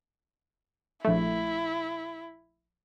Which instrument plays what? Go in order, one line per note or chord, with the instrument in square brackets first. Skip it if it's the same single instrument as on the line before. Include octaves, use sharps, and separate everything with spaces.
[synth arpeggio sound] A#1 A3 [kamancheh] E4